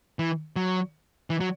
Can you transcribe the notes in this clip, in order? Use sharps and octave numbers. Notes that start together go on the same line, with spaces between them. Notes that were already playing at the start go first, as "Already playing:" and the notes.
E3
F#3
E3
F#3